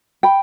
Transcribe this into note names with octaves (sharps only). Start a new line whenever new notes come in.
G5 B5